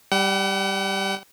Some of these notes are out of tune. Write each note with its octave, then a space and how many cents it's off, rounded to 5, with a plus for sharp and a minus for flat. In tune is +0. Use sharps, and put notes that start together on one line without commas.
G3 +0 F#5 +45